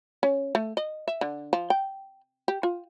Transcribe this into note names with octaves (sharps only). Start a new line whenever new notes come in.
C#4
A3
D#5
E5
D3
F3
G5
G4
F4